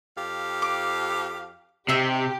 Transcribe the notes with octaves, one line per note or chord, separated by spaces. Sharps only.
F2 G4 F5
D6
C3 D#4 G4 E5 C6